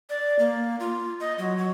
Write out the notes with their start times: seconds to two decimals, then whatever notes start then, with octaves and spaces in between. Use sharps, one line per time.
0.10 D5
0.39 A#3
0.80 F4
1.20 D#5
1.39 F#3
1.58 F#3